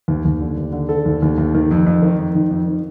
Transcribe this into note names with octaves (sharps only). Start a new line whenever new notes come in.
D#2
D#2
D3
D#2
D3
D3 A4
D#2
D#2
D#2
D#3
F2
F2
D#3
F2
D#3
F2
D#3